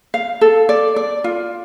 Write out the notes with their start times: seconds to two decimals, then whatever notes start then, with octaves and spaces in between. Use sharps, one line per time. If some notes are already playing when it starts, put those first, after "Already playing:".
0.14 F5
0.41 A4
0.69 D5
0.96 D5
1.24 F4